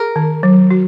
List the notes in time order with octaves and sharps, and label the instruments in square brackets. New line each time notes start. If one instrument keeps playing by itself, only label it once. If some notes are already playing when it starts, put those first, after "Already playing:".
Already playing: [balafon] G#4 [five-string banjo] A#4
[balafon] D#3
F#3
F#4